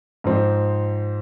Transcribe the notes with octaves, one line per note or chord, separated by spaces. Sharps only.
G#2 F3 C4